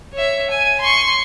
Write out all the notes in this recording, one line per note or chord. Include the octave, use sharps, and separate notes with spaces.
C#5 E5
G#5
C6 C#6